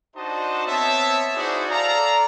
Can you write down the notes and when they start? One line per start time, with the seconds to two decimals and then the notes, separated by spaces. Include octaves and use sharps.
0.15 D4 D#4 F#4 C5 D#5 A5
0.66 B3 C4 C#5 E5 A5
1.35 D#4 E4 F#4 G#4 C5 D5
1.70 A4 D5 F5 A#5